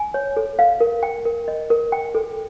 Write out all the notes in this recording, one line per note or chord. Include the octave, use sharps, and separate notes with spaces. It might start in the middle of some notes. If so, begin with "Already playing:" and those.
Already playing: G#5
C#5
A4
F5
A#4
G5
A#4
D#5
A#4
G5
A4